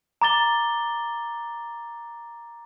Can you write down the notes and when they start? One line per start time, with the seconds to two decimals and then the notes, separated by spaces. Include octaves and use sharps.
0.22 A#5 D6 A6 G7